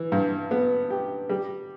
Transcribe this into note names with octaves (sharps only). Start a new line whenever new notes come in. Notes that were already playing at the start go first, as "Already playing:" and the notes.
Already playing: E3
G2
B3
G4
G3